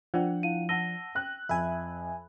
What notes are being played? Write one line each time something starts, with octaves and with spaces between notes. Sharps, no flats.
F3 D4 F#5 G5
E4 F5 D#7
F#5 A5 E6 A#6 D#7 G7
G5 F#6
F2 E5 G#5 B5